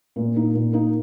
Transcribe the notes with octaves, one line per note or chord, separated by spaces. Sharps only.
A#2
A#3 D#4
A#2
A#3 D#4